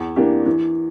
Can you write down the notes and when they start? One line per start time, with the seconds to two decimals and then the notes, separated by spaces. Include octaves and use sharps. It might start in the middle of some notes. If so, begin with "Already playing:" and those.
Already playing: E2
0.16 E3 A#3 D4 G4
0.46 E3